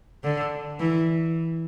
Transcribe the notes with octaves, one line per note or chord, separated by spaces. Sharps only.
D3
E3